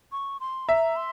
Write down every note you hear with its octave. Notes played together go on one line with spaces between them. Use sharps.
C#6
C6
E5 A#5
C6